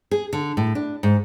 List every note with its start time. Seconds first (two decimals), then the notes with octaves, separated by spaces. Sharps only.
0.11 G#4
0.33 D3
0.57 A2
0.75 D4
1.03 G#2